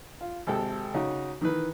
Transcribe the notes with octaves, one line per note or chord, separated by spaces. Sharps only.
F4
G#1 C3 A4 G5
C#3 D#4 F#4
D#3 E3 B4